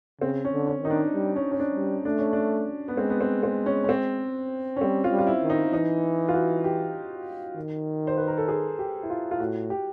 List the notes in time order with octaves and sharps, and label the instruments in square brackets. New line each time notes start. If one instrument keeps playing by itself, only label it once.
[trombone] C#3 [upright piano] C4
[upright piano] C#4
[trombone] D3
[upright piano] C#4
[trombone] D#3 [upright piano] D#4
[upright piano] D4
[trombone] G3
[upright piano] C#4
C#4
D4
[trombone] G3
[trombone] A3 [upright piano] D4
[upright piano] C#4
D4
B3
[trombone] G#3 [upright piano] C4
[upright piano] B3
C4
C4
C#4
C#4
C4
C#4
[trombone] G3 [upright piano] C4
[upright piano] F4
[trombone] G3
[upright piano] F4
E4
[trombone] D#3
[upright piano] D#4
[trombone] E3 [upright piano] D#4
[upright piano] F4
F#4
G4
[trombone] D#3
[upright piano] C5
B4
A#4
A4
G#4
G4
E4
F4
F4
[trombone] A2 [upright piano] F#4
[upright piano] G4